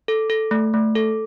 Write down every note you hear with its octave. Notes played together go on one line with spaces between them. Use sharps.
A4
A4
A3
A3
A4